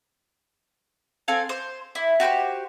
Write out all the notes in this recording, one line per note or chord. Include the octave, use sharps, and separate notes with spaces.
C4 A4 F5 G#5
C5
E4
F#4 G4 B4 C5